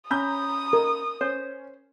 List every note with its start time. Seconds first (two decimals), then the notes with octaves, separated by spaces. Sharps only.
0.11 C#4 A#5 B5 D#6 G6
0.73 A#4
1.21 C#4 C5